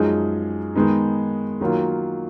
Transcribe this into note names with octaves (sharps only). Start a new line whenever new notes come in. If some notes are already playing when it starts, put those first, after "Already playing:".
Already playing: F#2 F3 G#3 D#4 G#4
D#3 G#3 B3 D#4
D#3 F#3 A#3 F4